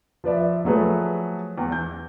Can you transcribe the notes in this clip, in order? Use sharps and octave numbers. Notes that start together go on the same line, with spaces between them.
F3 B4 D5 E5
F3 F#3 A3 G#4 B4
E2
G6